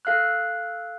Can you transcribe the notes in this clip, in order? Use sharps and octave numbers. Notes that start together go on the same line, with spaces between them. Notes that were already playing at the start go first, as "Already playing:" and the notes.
A4 F5 F6 F#6